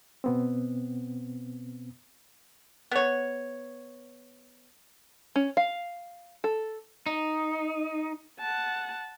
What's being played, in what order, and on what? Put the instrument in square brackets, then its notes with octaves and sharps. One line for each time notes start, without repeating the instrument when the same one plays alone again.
[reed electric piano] B2 B3 C4
[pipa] B3 C#5
[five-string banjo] C#4
F5
A4
[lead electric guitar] D#4
[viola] F#5 A5